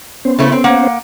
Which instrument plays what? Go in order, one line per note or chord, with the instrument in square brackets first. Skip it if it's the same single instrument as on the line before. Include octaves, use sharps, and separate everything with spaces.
[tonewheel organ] B3 C#4 C5
[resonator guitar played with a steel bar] C#3 A3 E4
C4
A#3 F#5